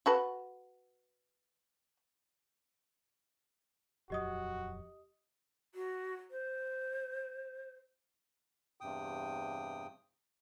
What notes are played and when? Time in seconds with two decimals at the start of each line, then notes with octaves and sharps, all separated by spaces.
0.06 F#4 A4 B4
4.10 D#1 F2 F#3 F#4 G4 D#5 D#6
5.75 F#4
6.31 C5
8.81 E2 G2 C3 G5 D#6